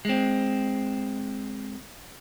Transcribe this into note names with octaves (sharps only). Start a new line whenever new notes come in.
G#3 C4